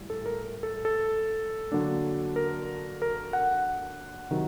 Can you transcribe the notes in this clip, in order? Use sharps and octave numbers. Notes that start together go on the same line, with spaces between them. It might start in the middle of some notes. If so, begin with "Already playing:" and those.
Already playing: A2 G3
A4
A#4
A4
A4
D3 F#3 A#3 D4
A#4
A#4
F#5
C3 D#3 F#3